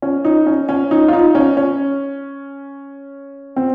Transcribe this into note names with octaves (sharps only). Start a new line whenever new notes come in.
C#4
D#4
C#4
C#4
D#4
F4
D#4
C#4
C#4
C4